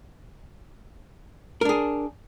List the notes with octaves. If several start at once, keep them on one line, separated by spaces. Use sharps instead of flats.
D4 G#4 A#4